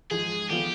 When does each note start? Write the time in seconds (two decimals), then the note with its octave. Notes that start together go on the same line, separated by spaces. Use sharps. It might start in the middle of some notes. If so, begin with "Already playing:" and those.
0.11 G#2 F3 G#3 G#4
0.49 D3 F3 B3 F4 G4